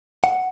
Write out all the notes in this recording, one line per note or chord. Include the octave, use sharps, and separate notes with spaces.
F#5